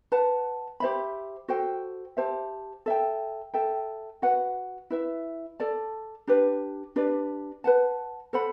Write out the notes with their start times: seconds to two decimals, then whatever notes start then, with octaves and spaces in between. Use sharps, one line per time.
0.12 B4 F#5 A5
0.80 G4 C5 E5 B5
1.48 F#4 A4 C5 G5
2.17 G4 C5 E5 A5
2.86 A4 E5 G5
3.54 A4 E5 G5
4.22 F#4 B4 F#5
4.90 E4 B4 E5
5.60 A4 D5 A5
6.27 D4 G4 B4
6.96 D4 G4 B4 D5
7.64 B4 F#5 A5
8.33 A4 C5 F#5 B5